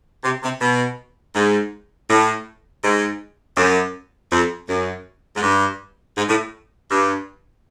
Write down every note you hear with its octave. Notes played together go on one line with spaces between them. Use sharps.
C3
C3
B2
G#2
A2
G#2
F#2
F2
F#2
G#2
G2
G#2
A2
G2